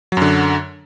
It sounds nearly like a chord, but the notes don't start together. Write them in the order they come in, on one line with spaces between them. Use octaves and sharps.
F#3 F#2 D3